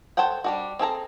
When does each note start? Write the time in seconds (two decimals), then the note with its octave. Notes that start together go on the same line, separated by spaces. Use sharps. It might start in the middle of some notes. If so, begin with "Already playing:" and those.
0.17 A4 C5 C#5 F#5 G5
0.44 G3 D4 F#4
0.79 C4 G#4 A4 A#5